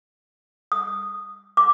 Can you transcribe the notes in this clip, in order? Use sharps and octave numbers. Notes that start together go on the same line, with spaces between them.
D#6
D6